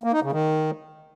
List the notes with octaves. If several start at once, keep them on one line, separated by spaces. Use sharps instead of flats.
A#3
D#4
C#3
D#3